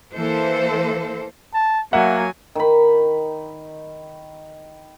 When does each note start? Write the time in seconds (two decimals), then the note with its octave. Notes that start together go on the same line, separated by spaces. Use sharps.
0.14 E3 A#3 A4 C5
1.54 A5
1.93 F#3 A#3 E5 F#5 G#5
2.55 D#3 B5